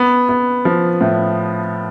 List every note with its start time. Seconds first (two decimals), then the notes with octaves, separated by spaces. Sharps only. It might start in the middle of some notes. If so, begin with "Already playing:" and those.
Already playing: B3
0.29 B3
0.65 F3
1.01 A2